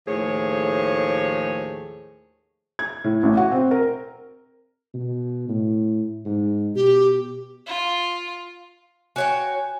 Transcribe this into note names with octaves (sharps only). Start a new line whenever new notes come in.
D#2 A2 F3 A3 G#4 C#5
G#6
A2
A1
F#4
C4
A#4
B2
A2
G#2
B2 G4
F4
F#4 C#5 G5 G#5